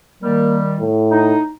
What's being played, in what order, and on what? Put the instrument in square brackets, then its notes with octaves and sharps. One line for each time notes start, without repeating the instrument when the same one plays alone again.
[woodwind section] D#3 G3 [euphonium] A#3
[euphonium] A2
[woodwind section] D#4